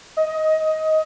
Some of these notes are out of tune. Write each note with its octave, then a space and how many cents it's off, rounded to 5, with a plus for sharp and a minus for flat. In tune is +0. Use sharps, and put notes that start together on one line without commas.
D#5 +15